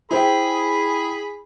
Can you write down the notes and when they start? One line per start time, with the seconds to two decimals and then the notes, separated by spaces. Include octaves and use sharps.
0.11 E4 G#4 C5 G5 B5